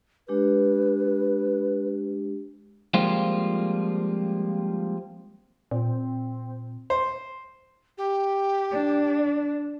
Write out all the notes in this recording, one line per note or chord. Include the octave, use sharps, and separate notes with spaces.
G#3 D4 G4 B4
F3 G3 G#3 A#3 C4 F4
A#2 C4
C5
G4
D4